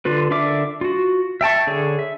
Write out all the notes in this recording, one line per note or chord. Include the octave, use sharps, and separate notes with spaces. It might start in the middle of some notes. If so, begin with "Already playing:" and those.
D3 F4 B4
D3 D4 A#4 E5 D6
F4 F#4
E5 G5 A5 C#6
D3 G#4 C#5
E5